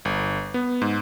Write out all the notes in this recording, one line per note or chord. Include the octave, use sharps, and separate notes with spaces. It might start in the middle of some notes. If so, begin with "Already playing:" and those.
G1
B3
G#2